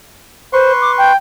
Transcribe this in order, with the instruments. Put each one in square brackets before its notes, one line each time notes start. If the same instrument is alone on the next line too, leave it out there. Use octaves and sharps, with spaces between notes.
[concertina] B4 C6 C#6 [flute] C5
[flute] D6
G5